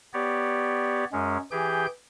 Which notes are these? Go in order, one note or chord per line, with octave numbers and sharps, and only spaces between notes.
B3 G4 C#5 D5
F#2 G#3 C#4
E3 G4 G#4 G5 G6